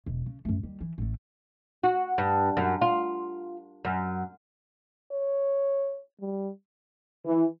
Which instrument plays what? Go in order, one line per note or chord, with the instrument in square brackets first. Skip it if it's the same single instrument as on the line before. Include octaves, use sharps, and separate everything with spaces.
[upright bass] E1
C#3
F#2 A3
D#2 G3
E3
A1 A3
[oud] F#4
G2
F#2
F4
F#2
[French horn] C#5
G3
[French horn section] E3